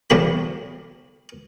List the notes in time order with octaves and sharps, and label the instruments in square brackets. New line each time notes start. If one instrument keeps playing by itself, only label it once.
[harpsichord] B1 E2 A2 G4 B5